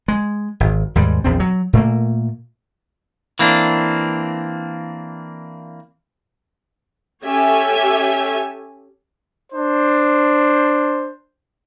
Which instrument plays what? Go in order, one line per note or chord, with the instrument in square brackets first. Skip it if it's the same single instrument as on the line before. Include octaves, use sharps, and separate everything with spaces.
[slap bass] G#3
G#1
D#2 G#2 G3 G#3
A#1 E2 C4
F#3
A#2 A3 A#3
[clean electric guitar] E3 A#3 C4 D4
[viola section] C#4 G4 A4 C#5 E5 G#5
[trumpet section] D4 C5